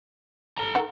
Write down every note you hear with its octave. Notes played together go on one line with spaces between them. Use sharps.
A4 A#5
D#3 F#5